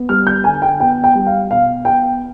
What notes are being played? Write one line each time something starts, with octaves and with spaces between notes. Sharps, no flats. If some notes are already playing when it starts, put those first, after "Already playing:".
Already playing: B3
G3 F6
G6
D3 G#5
G5
B3 G5
G5
G3
F5
B2 F5
B3 G5